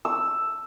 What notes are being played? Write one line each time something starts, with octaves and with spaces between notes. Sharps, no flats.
E6